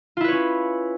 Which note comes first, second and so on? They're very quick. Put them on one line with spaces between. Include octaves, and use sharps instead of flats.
F4 E4 B4 C#5 C#4